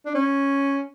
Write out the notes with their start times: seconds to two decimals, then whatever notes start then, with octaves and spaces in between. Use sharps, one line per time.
0.05 D4
0.15 C#4